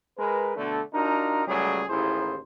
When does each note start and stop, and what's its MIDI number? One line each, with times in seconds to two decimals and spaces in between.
0.18 0.56 56
0.18 0.56 70
0.18 0.56 71
0.56 0.81 47
0.56 0.81 50
0.56 0.81 57
0.56 0.81 62
0.94 1.46 62
0.94 1.46 63
0.94 1.46 65
0.94 1.46 66
0.94 1.46 70
1.46 1.84 37
1.46 1.84 54
1.46 1.84 55
1.46 1.84 57
1.46 1.84 68
1.88 2.37 33
1.88 2.37 39
1.88 2.37 64
1.88 2.37 68
1.88 2.37 72